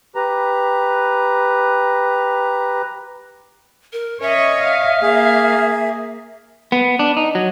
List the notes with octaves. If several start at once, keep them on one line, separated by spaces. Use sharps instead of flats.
G4 B4 A#5
A#4
C#4 C#5 D#5 E5
F5
A#3 G#4
B3
D4
D#4
F#3